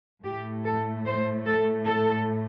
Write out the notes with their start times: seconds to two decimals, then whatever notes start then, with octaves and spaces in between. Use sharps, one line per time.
0.23 A2 A3 G4
0.64 A4
1.05 C5
1.45 A4
1.86 A4